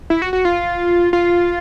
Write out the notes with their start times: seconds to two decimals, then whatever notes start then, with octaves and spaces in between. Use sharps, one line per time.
0.10 E4
0.22 F#4
0.33 F#4
0.45 F4
1.13 F4